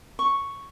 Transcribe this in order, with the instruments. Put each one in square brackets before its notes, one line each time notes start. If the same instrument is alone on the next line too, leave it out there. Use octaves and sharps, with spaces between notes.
[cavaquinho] C#6